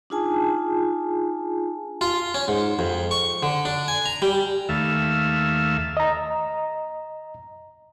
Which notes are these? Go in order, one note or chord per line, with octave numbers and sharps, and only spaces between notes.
D4 D#4 F4 G#4 G#5 A5
F4
C#4
G#2
F2
C#6
D3
D4
G#5
A#5
G3
D#2 A3 E5 F5
D#5 A#5